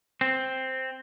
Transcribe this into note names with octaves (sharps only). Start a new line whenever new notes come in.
C4